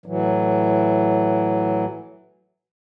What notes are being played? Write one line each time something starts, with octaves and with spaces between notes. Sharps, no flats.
A2 E3 F#3